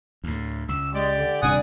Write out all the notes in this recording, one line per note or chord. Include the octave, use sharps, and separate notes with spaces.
D2 A2
C#2 E6
G#3 G4 D5
D3
D#1 C3 G3 D4 F#5 G#5 D#6